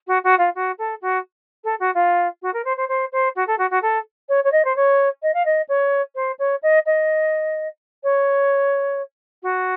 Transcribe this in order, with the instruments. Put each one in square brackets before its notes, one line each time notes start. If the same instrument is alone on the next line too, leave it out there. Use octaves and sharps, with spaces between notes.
[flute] F#4
F#4
F4
F#4
A4
F#4
A4
F#4
F4
F#4
A#4
C5
C5
C5
C5
F#4
A4
F#4
F#4
A4
C#5
C#5
D#5
C5
C#5
D#5
F5
D#5
C#5
C5
C#5
D#5
D#5
C#5
F#4